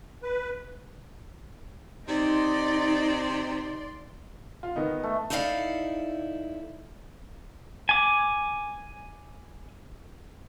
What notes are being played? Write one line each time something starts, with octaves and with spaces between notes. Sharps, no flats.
B4
C3 D#4 D5 C6
F4
D#3 B3 D#4
A3
D#4 E4 A4 D5 D#5 F5
G#5 D6